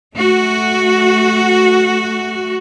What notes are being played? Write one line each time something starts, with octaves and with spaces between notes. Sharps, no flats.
A3 F#4